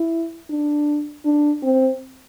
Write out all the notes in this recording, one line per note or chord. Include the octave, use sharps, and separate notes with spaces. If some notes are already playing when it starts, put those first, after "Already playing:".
Already playing: E4
D4
D4
C4